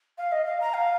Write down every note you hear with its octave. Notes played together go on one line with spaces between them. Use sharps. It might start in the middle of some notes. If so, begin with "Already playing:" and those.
F5
D#5
F5
A#5
F5